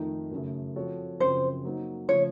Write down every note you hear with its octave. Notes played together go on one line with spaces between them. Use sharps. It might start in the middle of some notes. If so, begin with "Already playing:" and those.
Already playing: F2 D#3 A3 D#4
F#2 C#3 A3
F3 C4 F#4 A4 C#5
F#2 C#3 F3 C4 C5
F#3 A#3 D#4
C#3 F3 A3 C#5